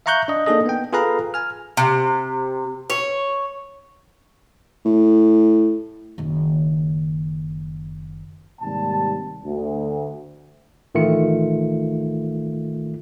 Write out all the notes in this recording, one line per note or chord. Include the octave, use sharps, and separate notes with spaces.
E5 F5 A#5 C#6 F#6 G6
D4 D#5
A#3 D4 D#4 G#4 A4 D#5
B3 G5
F4 G#4 A4 B4 F5 A#5
G#5 F6
C3
C#5
A2
F#1 D#3
D#2 G#2 C3 G3 A5
D2
A1 D#3 A3 F4 C#7